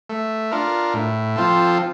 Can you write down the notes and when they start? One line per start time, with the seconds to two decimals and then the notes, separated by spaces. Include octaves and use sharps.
0.09 A3
0.51 D4 F4 A#4
0.94 A2
1.36 F3 C4 F4 A4